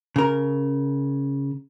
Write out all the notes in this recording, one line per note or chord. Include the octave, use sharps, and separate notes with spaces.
C#3 A#4